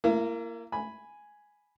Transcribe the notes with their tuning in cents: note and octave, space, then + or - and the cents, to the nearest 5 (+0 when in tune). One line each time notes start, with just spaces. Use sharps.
A#3 -10 E4 +35
G#5 +0 B5 +0